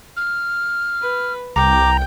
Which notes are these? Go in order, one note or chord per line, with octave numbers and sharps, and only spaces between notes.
F6
B4
C2 G5 A#5 D6